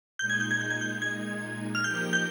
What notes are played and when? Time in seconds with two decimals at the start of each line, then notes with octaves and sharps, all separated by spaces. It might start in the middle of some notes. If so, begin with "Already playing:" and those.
0.19 A#2 G#3 D#4 G6
0.30 G#6
0.40 G6
0.51 G#6
0.61 G6
0.70 G#6
0.81 G6
1.02 G#6
1.75 F6
1.84 F3 A#3 D#4 G4 A#4 G6
2.13 G6